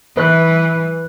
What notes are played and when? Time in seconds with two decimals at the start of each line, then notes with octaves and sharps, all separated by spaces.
0.17 E3 B4 F#6